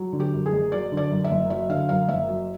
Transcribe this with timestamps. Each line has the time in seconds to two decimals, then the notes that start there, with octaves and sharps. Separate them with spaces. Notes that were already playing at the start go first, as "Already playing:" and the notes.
Already playing: F#3
0.13 D3
0.20 G4
0.33 F#2
0.46 G#4
0.52 F#1
0.72 F#3 D5
0.92 D3
0.97 D5
1.11 F#2
1.24 E5
1.31 F#1
1.50 F#3 E5
1.69 D3 F5
1.89 F#2 F5
2.09 F#1 E5
2.29 F#3